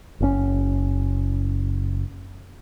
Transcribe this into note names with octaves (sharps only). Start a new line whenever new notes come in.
F#1 A2 C#4